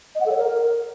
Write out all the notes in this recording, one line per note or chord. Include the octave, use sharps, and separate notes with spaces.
D#5
F#5
A4
C#5
A#4